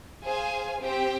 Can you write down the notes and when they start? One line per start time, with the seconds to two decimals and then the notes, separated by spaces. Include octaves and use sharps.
0.24 G#4 C5 F5 G#5
0.82 C4 G4 C5 G5